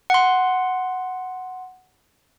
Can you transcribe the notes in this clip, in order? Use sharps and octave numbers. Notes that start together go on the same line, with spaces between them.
F#5 C6